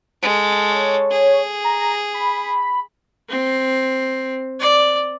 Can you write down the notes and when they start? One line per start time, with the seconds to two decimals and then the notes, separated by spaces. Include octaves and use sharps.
0.22 G#3 A4
0.70 C#5
1.11 G#4
1.64 A#5
2.14 B5
3.30 C4
4.60 D5